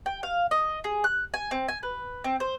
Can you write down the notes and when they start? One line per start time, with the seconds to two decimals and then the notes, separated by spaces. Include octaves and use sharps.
0.06 G5
0.23 F5
0.51 D#5
0.84 G#4
1.04 F#6
1.34 G#5
1.51 C4
1.68 G#5
1.83 B4
2.24 C4
2.40 C5